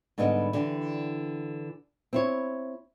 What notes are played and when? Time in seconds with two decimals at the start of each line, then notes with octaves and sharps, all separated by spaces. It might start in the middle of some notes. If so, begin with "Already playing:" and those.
0.18 G#2 D3 G3 B3 D#5
0.53 D3 E3 G4
2.13 C4 E4 C#5